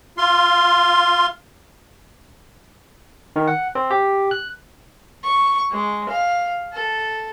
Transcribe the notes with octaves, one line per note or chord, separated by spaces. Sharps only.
F4 C6
D#3
F#5
C4
G4
F#6
C#6
G#3
F5
A4